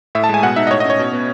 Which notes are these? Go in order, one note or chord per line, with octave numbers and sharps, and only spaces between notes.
A2 E5
A5
G#3 G#5
B2 F#5
D#4 E5
D#5
A2 C#5
D#5
C#4
C#5
B2
B3